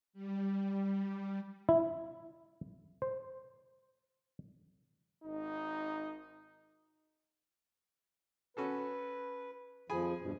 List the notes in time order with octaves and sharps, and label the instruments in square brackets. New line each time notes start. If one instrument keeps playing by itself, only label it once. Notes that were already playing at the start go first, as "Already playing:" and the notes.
[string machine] G3
[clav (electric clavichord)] E4
C5
[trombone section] G#1 D#4
[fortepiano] C#4 F#4 A4 [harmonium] B4
[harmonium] F2 F3 [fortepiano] G#4 G#5 B5
[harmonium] E2 G2 B2